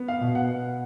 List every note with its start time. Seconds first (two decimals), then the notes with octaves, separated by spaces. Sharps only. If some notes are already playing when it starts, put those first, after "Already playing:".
Already playing: B3
0.08 F5
0.21 B2
0.35 F#5